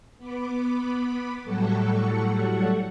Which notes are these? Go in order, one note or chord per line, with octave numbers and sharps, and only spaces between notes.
B3 B5 D6
A2 F#3 G3 A4 F#5 C#6